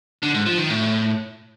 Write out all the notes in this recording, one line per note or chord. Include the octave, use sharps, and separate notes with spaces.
D3
G#2
F3
D#3
A2